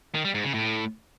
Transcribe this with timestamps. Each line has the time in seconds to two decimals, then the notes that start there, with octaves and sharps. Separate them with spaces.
0.15 D#3
0.25 G3
0.34 G#2
0.44 C#3
0.54 A2